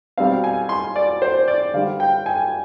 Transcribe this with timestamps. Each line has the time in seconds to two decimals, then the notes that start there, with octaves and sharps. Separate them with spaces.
0.18 B2 G3 C4 F5
0.44 G#5
0.69 C6
0.96 D5
1.22 C5
1.48 D5
1.74 D3 G3 D4 F5
2.00 G5
2.26 G#5